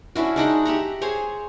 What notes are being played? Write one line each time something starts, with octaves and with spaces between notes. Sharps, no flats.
C#4 D4 E4 F#4
G#3 D4 D#4 F#5
G4 E5 F#5 A#5
G#4 C5 C#5